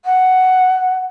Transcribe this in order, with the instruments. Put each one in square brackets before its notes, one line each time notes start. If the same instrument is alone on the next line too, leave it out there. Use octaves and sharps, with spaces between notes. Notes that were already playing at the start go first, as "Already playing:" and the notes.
[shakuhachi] F#5